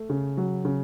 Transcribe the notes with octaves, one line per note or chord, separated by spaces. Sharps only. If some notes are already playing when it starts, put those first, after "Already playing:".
Already playing: A3
C#3
F#3
C#3